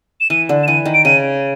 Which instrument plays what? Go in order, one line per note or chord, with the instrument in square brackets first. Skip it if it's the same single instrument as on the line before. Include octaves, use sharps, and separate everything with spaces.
[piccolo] E7
[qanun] E3 [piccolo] D#7
[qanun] D3
[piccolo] E7
[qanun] E3 [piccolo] D#7
[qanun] D#3
[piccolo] D7
[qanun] C#3 [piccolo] D#7